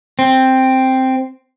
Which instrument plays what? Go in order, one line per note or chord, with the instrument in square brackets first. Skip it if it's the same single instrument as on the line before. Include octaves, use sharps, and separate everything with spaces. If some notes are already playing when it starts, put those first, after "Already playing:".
[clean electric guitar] C4